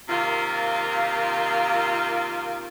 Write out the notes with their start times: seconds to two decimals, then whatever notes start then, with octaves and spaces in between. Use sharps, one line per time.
0.09 C3 D#3 A#3 F4